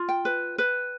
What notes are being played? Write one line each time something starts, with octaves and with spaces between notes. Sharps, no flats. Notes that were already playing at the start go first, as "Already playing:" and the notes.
Already playing: F4
G5
B4
B4